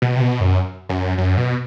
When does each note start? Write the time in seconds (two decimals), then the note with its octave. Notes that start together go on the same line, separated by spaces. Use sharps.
0.02 B2
0.16 C3
0.22 B2
0.40 F#2
0.89 F#2
1.18 F#2
1.37 B2